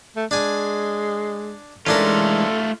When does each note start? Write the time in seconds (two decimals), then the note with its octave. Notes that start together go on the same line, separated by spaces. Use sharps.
0.16 A3
0.31 G#3 D4 G#5
1.87 E3 G#3 A3 C#4 D4 F4 A4 A#4